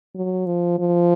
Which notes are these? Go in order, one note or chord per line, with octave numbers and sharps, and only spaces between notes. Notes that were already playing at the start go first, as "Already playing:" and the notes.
F#3
F3
F3